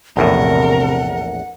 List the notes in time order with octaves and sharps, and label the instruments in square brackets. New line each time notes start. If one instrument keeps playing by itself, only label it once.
[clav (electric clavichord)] A#1 E2 A2 [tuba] C3 [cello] A#4 [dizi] F#5